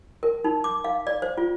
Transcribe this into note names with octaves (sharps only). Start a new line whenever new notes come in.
A#4
D#4
D6
F5
D5
C5
F4